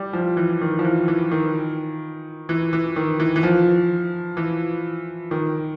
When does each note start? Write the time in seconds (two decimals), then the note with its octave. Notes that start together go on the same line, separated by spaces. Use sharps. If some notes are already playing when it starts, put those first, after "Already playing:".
Already playing: G3
0.13 F3
0.37 E3
0.61 D#3
0.79 F3
0.85 E3
1.08 E3
1.31 D#3
2.49 E3
2.73 E3
2.96 D#3
3.20 E3
3.36 E3
3.43 F3
4.37 E3
5.31 D#3